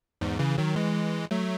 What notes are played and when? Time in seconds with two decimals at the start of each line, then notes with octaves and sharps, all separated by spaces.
0.21 E2 G#2
0.39 C#3 E3
0.58 D#3 F#3
0.76 E3 G#3
1.31 F#3 A3